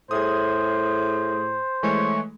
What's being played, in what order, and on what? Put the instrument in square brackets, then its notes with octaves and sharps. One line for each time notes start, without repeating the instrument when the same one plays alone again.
[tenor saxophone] A2 [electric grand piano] G#4 D#6 [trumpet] C5
[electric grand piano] E3 G#3 A3 [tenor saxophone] C#5